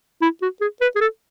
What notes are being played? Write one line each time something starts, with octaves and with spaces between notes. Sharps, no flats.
E4
F#4
G#4
B4
G#4
A4